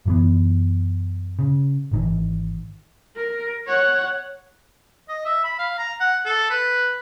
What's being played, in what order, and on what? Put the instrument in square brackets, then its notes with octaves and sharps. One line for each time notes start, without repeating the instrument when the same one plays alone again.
[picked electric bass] F#2 E3 B3
C#3
G#1 D#3 E3
[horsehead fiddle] A#4
C#5 F#5
[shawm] D#5
E5
B5
F5
A#5
F#5
A4
B4